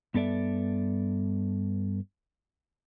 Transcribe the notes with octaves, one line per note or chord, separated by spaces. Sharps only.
G2 B3 A4 D5 E5